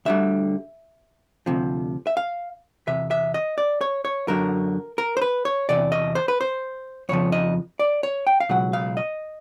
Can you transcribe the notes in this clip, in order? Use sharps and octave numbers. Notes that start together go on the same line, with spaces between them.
D2 D3 G3 E5
D2 C3 F3
E5
F5
E2 C3 E5
E5
D#5
D5
C#5
C#5
F#2 D3 F#3 A#4
A#4
C5
B4
C#5
E2 C3 D5
D#5
C5
B4
C5
F2 C#3 F3 C#5
D#5
D5
C#5
G5
F5
C#2 B2 F#3 F#5
F5
D#5